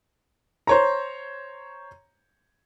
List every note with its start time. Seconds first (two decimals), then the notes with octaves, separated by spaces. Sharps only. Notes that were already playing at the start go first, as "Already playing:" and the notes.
0.67 C5 C#5 A#5